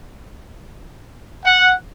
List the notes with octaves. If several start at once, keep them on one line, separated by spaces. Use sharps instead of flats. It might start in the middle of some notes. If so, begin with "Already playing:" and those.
F#5